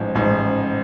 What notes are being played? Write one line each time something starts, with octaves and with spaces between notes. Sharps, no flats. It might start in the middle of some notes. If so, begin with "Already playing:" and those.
Already playing: A1 G#2 F3
A1 G#2 F3